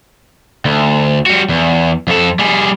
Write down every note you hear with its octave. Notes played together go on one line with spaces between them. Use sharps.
D2
G3 F#4
E2
F2 A4
G3 G#4